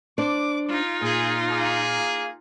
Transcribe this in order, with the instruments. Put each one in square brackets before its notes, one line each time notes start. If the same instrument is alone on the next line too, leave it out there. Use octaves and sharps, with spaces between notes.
[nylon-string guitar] D4 C5 D5 [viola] D6
[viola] D#4 F4
[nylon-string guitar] A#2 [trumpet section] G#4
[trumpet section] A#3 G#4